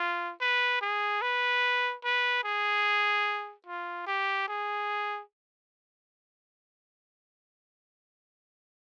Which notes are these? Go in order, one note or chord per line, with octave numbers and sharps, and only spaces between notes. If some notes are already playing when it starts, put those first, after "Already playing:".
Already playing: F4
B4
G#4
B4
B4
G#4
F4
G4
G#4